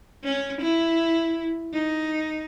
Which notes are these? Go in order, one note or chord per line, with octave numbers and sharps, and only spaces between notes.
C#4
E4
D#4